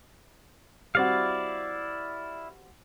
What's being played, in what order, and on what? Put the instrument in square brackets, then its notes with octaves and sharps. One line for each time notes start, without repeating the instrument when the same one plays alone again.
[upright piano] G3 C4 F#4 [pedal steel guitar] E4 D5 F5